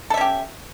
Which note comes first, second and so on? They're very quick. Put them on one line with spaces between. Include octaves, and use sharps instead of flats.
A4 E5 C#4 G4